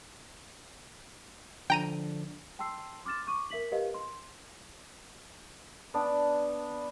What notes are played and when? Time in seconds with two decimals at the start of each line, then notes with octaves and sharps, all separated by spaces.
1.70 D3 F3 D4 G5 A#5 D#7
2.59 G5 A5 C6 E6 C7
3.05 C6 D6 F6 A6 E7
3.27 C#6 D6 D#7
3.50 A#4 E5 B6 F#7
3.72 G4 A#4 B4 D#5 F5
3.94 C6
5.94 B3 D4